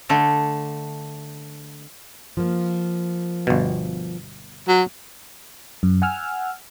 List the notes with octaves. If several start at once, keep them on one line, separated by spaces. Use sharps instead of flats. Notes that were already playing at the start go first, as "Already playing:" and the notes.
D3 A3
F3 A#3
G1 B2
F#3
F#2
F#5 G#5 E6 F6